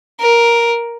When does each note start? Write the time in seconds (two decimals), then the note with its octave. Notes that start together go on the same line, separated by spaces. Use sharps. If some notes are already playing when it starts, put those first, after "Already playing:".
0.20 A#4